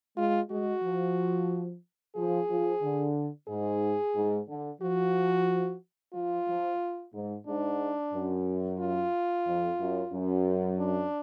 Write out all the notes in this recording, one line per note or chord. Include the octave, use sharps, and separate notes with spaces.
G#3 F4
G#3 F#4
F3
F3 G#4
F3
D3
G#2 G#4
G#2
D3
F3 F#4
F3 F4
F3
G#2
G#2 D4
F#2
F4
F2
F#2
F#2
D4